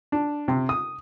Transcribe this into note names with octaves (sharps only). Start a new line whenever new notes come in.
D4
C3
D#6